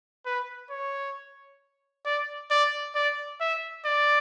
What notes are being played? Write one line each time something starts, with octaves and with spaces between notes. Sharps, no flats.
B4
C#5
D5
D5
D5
E5
D5